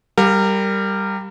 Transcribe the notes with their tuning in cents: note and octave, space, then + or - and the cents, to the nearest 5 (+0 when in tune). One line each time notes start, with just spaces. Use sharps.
G3 +0 A#4 -20 F5 +40